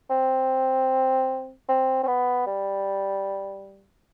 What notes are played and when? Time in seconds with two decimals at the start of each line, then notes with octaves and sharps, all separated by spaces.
0.10 C4
1.69 C4
2.03 C4
2.07 B3
2.47 G3